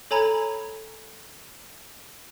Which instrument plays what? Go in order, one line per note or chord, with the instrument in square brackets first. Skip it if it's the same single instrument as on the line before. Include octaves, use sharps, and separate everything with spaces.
[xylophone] A4 C#5 G#5 A#5 B5 G#6